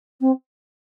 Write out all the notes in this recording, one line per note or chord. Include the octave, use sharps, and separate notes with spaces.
C4